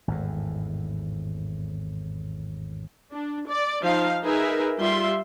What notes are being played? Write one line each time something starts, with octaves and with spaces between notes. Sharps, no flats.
G#1 E2 A2
D4
D5
F3 D#4 F5
D#4 G#4 A#4 B4 E5
G3 F4 E5 C6